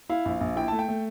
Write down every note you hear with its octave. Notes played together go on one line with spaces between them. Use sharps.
E4 F5
A#1
A#1
E4 G5
A3 A5
G5
A3